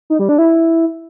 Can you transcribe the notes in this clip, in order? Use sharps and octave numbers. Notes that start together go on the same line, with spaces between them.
D#4
G3
D4
E4